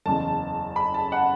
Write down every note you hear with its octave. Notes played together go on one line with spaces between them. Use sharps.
F#1 E2 C#3 A5
B5
A5
F#5